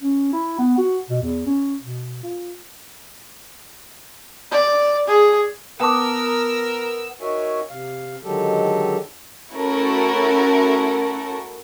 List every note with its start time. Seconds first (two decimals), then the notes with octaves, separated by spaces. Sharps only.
0.01 C#4
0.33 E4
0.59 B3
0.78 F#4
1.10 B2
1.22 E2
1.46 C#4
1.82 B2
2.23 F4
4.51 D5
5.07 G#4
5.80 B3 A#4 G5 A5 D6 E6
7.21 D#4 F#4 A#4 C#5 E5 G#5
7.70 C3 F5
8.24 D3 D#3 F#3 G#3 G4 A4
9.54 A3 C#4 E4 F#4 A4 A#4